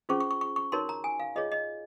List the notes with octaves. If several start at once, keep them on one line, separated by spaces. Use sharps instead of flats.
C#4 F4 G#4 C5 C#6
C#6
C#6
C#6
C#6
D#4 F#4 A#4 C#5 C6
A#5
G#5
F5
F4 G#4 C#5 D#5
D#5